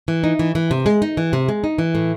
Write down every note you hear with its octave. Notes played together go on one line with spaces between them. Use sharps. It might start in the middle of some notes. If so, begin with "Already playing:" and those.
E3
D#4
E3
E3
C3
G#3
D#4
E3
C3
G#3
D#4
E3
A2